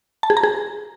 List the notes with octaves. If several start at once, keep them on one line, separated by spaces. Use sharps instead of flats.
A5
G#4
A#5
G#4